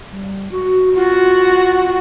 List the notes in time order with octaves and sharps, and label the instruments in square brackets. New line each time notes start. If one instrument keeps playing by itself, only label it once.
[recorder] G3
F#4
[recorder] F4 [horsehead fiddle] F#4